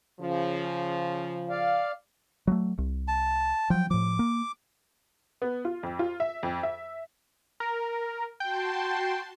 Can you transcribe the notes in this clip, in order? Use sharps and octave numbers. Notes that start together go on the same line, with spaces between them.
C#3 F3
D5 F5
F#3 G#3 A3
C2
A5
F3 F#3 G5
A2 F3 D6
A#3
B3
F4
F2
F4
E5
F2
E5
A#4
F#4 G5 A5 C6